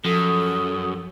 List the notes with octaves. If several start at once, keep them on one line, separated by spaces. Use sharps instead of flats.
F#2 F3 A4 D#6